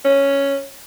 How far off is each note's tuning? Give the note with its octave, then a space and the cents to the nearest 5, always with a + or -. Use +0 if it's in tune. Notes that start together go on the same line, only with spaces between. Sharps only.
C#4 +0